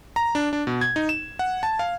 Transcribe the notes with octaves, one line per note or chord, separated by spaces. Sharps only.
A#5
D4
D4
B2
G#6
D#4
E7
F#5
A5
F5